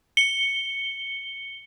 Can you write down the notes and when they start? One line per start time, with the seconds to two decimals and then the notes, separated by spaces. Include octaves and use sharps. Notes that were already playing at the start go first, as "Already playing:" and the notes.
0.17 C#7 G7